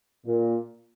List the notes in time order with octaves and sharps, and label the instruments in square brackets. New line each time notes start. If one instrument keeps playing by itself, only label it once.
[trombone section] A#2